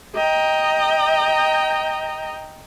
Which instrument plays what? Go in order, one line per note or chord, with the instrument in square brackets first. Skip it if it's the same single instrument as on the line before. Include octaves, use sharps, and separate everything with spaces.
[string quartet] D#5 G5 A#5